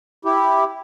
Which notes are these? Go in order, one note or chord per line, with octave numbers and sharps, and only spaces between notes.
E4 G4